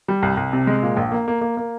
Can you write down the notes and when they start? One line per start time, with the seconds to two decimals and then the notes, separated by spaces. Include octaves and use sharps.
0.08 G3
0.23 C2
0.37 C2
0.53 C3
0.67 G#3
0.83 A#2
0.97 A#1
1.12 A#3
1.28 A#3
1.41 A#3
1.57 A#3